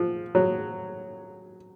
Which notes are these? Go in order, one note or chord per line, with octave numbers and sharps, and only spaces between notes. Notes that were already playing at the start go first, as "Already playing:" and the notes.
Already playing: F3
F#3